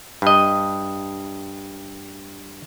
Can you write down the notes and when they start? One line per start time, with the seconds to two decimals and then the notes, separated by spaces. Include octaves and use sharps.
0.22 G2 D#5